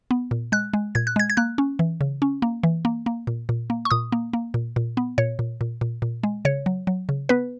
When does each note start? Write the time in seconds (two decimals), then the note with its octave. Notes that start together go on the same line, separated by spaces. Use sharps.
0.11 B3
0.31 A#2
0.52 G#3 F#6
0.73 G#3
0.95 A#2 G#6
1.07 F#6
1.16 G#3 G#6
1.30 G#6
1.37 A#3 F#6
1.58 C#4
1.79 E3
2.01 C#3
2.22 C#4
2.42 A#3
2.63 E3
2.85 A#3
3.06 A#3
3.27 A#2
3.49 A#2
3.70 A#3
3.85 C#6
3.91 A#2 D#6
4.12 A#3
4.33 A#3
4.54 A#2
4.76 A#2
4.97 B3
5.18 A#2 C#5
5.39 A#2
5.61 A#2
5.81 A#2
6.02 A#2
6.23 G#3
6.45 C#3 C#5
6.66 F#3
6.87 F#3
7.09 C#3
7.29 B3 B4